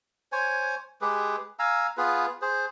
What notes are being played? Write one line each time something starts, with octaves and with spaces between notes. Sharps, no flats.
C5 C#5 G#5
G#3 G4 G#4 B4
F5 G#5 A#5 E6
B3 F4 G#4 B4
G#4 C5